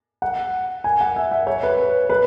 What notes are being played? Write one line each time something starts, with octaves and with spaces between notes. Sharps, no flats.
F#5
G#5
F#5
E5
E5
C#5
B4
B4